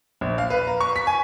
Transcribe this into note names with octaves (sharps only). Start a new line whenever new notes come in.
A#1
F5
B4
A#5
C#6
B6
G#5